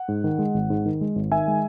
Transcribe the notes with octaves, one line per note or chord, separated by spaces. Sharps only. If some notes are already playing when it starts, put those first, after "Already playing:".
Already playing: F#5
G#2
D#3
G#3
G#1
G#2
D#3
G#3
G#1
D#3 E5 G#5
G#3